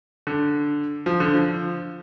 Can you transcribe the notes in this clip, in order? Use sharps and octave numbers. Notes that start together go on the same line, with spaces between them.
D3
F3
D3
F3